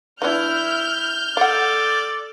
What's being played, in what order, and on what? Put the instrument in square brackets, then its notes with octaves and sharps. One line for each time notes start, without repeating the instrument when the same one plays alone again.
[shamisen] E3 B3 D4 [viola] E4 [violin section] F6 G6
[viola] A4 [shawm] D5 [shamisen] F5 F#5